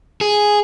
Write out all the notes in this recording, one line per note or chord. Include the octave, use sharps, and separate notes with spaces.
G#4